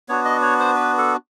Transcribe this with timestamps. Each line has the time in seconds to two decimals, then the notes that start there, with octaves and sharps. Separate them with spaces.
0.09 B3 D4 F#4 C#5
0.25 D#5
0.42 C#5
0.59 C5
0.76 B4
0.98 A4